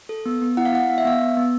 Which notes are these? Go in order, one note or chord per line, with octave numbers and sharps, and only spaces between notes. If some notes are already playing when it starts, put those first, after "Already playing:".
A4
B3
B3
E4 F#5
F5
E4 F#5
B3 F5
E5
B3 F5
B3
B3